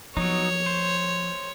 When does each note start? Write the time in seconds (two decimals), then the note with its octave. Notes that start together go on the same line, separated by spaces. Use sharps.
0.17 F3 F#3 B3 D#4 C#5
0.66 C5